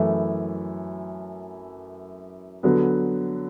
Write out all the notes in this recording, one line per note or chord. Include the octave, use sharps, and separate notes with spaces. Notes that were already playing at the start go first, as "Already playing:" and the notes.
Already playing: F#2 E3 A3 E4
D3 F#3 B3